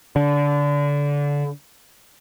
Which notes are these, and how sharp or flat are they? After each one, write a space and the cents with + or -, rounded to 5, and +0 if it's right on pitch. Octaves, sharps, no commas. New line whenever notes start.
D3 -25